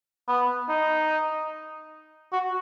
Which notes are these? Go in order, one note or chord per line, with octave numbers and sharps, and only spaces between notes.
B3
D#4
F#4